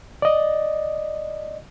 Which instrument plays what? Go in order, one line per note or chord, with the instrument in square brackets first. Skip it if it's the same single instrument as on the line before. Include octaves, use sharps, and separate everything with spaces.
[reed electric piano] D5 D#5